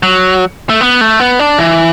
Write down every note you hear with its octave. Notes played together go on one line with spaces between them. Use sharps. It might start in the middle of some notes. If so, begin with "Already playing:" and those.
F#3
A3
B3
A3
B3
D4
E3